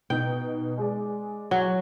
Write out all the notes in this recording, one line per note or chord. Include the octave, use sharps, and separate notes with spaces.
B2 D#4 G5
G#3 G#4 D5
F#3